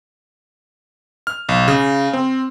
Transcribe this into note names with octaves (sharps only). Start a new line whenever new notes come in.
F6
B1
C#3
C4